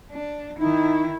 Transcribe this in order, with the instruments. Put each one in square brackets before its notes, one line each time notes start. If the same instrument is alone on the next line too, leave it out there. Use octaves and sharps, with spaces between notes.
[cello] D4
[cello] D#3 E4 [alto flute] D#4